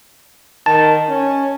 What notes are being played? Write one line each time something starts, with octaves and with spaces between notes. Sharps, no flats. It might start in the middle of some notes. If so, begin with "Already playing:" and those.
D#3 A5
C#4